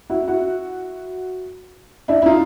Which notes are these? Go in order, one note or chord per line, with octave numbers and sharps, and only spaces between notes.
E4 F#4
E4 F#4
D4 E4
E4
D#4 F4